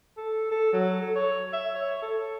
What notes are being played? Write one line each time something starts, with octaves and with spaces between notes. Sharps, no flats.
A4
A4
F#3
A4
C#5
E5
C#5
A4